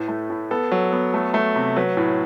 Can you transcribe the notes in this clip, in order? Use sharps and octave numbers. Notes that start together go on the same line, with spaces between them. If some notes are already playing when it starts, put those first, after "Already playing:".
Already playing: A2 B4
A3
A2
B3 A4
F#3
B3
A3
A3
C3
F#3 B4
A2